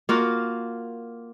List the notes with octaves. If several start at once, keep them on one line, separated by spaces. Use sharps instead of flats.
A#3 F4 F#4